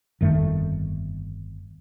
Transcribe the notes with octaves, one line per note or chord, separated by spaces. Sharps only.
G1 F2 D#3 A3